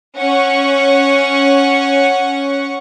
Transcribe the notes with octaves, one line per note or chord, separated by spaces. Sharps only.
C#4 F#5 C#6